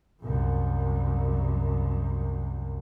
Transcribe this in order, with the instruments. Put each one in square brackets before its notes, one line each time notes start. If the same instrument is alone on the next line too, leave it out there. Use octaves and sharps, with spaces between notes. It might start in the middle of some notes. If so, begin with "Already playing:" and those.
[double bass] C2 F#2